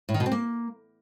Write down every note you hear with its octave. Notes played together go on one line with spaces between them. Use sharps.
A2
D#3
B2
C4
A#3